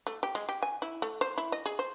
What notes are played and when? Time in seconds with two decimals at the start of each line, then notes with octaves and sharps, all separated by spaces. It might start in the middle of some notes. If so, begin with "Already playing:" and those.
0.07 A3
0.23 G4
0.35 G#3
0.49 G4
0.62 G#5
0.82 E4
1.02 A3
1.21 C5
1.38 E4
1.52 D#5
1.66 G#4
1.79 C5